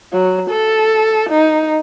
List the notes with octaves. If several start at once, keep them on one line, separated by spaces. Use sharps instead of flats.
F#3
A4
D#4